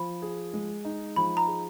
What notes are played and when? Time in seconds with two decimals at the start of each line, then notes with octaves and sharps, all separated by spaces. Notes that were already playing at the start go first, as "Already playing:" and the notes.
Already playing: F3 B5
0.22 G#4
0.53 G#3
0.85 D#4
1.16 F3 B5
1.37 A#5
1.47 G#4